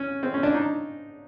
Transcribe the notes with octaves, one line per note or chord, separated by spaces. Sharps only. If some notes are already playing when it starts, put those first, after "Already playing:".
Already playing: C#4
C4
C#4
D4
D#4